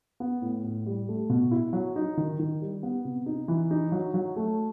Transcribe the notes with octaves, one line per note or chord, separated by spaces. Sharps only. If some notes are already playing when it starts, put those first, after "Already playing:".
B3
A2
A2
G3
A3
B2
E4
F#3
D#4
D#3
D#3
G3
B3
C3
D#4
E3
D#4
F#3
F#3
A3